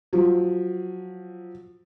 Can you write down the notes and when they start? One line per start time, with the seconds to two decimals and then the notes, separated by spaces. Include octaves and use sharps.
0.13 F3 F#3